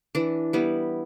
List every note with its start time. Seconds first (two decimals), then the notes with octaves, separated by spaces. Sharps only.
0.15 E3 D4
0.53 G3 B3 E4